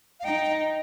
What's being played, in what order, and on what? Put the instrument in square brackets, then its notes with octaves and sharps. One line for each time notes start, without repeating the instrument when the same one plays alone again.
[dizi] F5
[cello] D#4 [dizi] G5